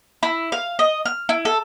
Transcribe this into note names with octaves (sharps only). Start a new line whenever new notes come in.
E4
F5
D#5
F6
E4
A4